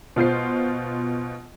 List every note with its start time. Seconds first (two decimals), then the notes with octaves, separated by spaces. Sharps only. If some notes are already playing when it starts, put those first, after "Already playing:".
0.16 B2 F4 C5 C7